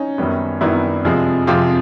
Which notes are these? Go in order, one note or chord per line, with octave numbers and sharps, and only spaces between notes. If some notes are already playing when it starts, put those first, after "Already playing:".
Already playing: C#4 D#4
F#2 D#3 G3 B3
F#2 D#3 G3 B3 D4 E4
F2 C3 F3 G#3
F2 C3 F3 G#3 F4 G4